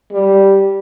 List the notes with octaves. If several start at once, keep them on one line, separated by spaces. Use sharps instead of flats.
G3